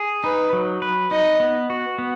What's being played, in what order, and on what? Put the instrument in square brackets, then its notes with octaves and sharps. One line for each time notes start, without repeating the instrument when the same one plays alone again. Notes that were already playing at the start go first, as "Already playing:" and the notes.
Already playing: [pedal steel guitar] G#4
[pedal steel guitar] D#4 [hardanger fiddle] B4
[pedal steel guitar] F#3
B4
[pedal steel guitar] D#4 [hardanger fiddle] D#5
[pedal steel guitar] B3
F#4
B3